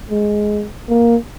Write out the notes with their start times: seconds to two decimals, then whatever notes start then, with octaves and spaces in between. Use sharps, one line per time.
0.11 G#3
0.89 A#3